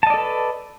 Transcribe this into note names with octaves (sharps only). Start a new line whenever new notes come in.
A4 B4 D5 D#5 A5